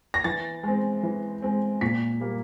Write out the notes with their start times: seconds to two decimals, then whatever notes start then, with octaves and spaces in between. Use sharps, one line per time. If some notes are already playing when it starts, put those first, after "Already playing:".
0.14 A#6
0.24 E3 A6
0.63 G#3 C4
1.03 E3
1.42 G#3 C4
1.81 A#2 B6
2.20 G3 A#3